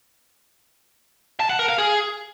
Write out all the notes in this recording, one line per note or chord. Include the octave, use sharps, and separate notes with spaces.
A5
F#5
A#4
F5
G#4